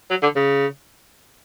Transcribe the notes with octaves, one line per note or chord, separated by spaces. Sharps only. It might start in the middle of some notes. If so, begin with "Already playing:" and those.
F#3
D3
C#3